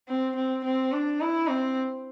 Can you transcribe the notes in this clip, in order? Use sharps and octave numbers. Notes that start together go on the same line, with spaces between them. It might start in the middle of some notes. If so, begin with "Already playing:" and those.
C4
C4
C4
D4
E4
C4